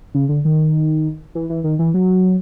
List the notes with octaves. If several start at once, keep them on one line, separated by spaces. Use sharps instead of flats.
C#3
D3
D#3
E3
E3
D#3
E3
F#3